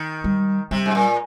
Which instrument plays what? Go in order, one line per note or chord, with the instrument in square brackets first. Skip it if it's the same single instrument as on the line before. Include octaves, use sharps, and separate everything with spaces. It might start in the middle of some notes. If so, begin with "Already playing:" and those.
Already playing: [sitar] D#3
[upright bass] G3
[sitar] C3 [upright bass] G3
[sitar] G#2
A#2